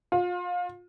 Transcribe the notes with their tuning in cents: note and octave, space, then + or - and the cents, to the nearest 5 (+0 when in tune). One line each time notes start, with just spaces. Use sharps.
F4 +30